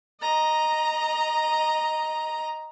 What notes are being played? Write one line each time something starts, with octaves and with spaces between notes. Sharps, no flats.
D#5 A#5